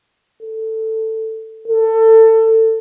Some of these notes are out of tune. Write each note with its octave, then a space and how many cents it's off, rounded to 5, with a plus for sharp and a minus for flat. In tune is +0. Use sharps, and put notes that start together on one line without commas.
A4 +10
A4 +25